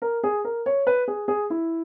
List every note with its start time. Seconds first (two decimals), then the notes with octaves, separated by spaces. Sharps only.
0.02 A#4
0.23 G#4
0.44 A#4
0.66 C#5
0.87 B4
1.08 G#4
1.28 G#4
1.50 E4